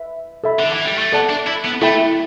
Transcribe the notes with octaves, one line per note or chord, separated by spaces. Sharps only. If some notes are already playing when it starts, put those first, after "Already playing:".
Already playing: B4 E5
A4 E5 B5
D3
E3
G3
A3
B3 A4 D5 A5
D4
E4
B3
A3 E4 A4 E5 G5 B5